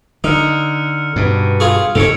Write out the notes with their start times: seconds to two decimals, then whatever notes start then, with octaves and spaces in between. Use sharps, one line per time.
0.24 D3 D#4 E6 F6 C#7
1.16 G2 B2
1.60 F4 G#4 C#6
1.95 G#2 C3 D#3 A4 C#5 C#7 D7 F7